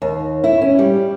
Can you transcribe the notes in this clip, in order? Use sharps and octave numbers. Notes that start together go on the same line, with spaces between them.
D#2
E4
C#4
G3